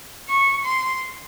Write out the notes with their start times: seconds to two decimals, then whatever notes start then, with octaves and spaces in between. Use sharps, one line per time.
0.29 C#6
0.65 C6